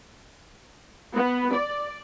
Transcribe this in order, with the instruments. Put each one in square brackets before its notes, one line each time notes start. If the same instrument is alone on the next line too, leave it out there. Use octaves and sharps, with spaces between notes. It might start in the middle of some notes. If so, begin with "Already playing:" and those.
[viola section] B3
D5